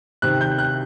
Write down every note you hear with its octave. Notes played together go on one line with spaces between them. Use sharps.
C3 D#3 F#6
G6
F#6